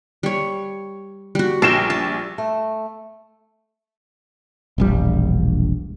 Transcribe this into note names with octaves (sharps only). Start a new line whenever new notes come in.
G3 C#5
G3 F#4
A#1 A#4 G5 C7 E7
A5
A3
E1 A#1 G3